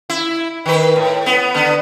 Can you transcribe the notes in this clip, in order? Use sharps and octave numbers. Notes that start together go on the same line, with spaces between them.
E4
D#3 B4
A2
B3
D3 B3